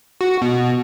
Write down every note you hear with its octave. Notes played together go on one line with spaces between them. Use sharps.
F#4
B2